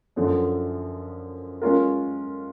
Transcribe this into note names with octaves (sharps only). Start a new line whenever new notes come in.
F#2 D3 F3
G#3 C#4 F4 A#4